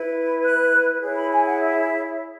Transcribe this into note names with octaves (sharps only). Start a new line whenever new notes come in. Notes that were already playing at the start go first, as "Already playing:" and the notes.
Already playing: E4 B4
F#6
E4 G#4 C#5
B5
G#5
F#5
E5